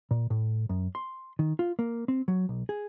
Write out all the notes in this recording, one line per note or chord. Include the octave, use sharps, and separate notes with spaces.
A#2
A2
F#2
C6
D#3
F4
A#3
C4
F#3
B1
G#4